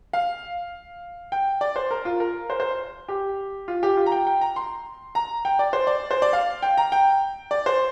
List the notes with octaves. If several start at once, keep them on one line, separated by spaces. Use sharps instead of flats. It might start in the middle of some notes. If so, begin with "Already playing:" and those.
F5
G5
D5
C5
A#4
F4
A#4
C5
C5
G4
F4
G4
F4
A#5
G5
G5
A#5
C6
A#5
G5
D5
C5
D5
C5
D5
F5
G5
A#5
G5
D5
C5